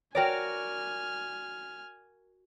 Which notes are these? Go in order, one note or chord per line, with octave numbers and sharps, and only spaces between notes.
F#4 A#4 C#5 D5 G5 G#5 F6